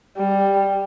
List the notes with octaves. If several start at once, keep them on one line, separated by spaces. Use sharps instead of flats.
G3